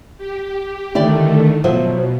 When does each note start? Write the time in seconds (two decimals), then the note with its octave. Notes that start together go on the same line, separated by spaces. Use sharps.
0.18 G4
0.95 D3 D#3 A3 E4 G4 D5
1.64 B2 F3 F#3 E5